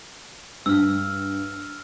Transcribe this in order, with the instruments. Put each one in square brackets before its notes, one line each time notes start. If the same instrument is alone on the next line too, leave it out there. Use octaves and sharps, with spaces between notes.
[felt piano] G2 [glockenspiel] E6 F6